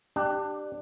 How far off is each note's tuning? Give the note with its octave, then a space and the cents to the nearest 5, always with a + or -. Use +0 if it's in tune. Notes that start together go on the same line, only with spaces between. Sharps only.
D4 +25 G4 +0